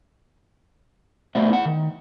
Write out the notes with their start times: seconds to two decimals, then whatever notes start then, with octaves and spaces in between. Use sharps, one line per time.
1.35 A3 B3 F#4 C5 D5 E5
1.50 E4 F#5
1.65 D#3